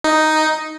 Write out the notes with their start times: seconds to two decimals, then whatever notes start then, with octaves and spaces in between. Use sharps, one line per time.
0.04 D#4